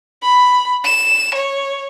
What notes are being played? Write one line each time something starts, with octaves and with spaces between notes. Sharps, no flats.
B5
E7
C#5